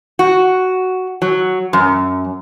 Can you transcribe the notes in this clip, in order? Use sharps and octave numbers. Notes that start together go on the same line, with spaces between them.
F#4
F#3
F#2